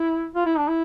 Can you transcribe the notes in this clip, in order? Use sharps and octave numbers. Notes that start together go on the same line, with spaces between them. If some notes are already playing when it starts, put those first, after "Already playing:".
Already playing: E4
F4
E4
D4
E4